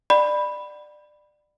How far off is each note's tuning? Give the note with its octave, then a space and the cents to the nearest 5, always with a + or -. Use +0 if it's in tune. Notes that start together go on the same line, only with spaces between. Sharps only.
D5 +25 F#5 +30 B5 +0